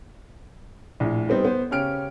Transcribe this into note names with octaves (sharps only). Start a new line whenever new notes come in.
A#1 A2
G3 B3 C4 D#4
B3 C5
C#3 C#4 G4 F6 D7